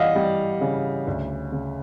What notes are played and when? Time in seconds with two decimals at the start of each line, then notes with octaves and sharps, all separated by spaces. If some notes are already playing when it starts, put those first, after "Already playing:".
Already playing: E3 G3 D#5 F5 F#5
0.15 G3
0.61 C#3
1.07 D2
1.52 C#3